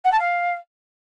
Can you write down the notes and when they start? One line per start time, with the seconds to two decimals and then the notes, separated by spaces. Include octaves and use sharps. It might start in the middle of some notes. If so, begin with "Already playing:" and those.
0.04 F#5
0.12 A5
0.19 F5